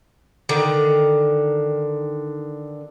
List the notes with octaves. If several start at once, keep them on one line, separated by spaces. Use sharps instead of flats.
D3 D#3